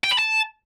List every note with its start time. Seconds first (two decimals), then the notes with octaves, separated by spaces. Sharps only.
0.04 G5
0.11 B5
0.18 A5